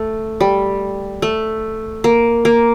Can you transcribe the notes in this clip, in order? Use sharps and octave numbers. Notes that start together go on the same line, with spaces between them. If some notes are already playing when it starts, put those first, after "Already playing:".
Already playing: A3
G3
A3
A#3
A#3